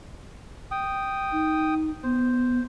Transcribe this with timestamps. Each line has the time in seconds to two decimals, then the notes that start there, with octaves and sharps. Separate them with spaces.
0.71 G5 D#6
1.32 D#4
2.03 B3 C5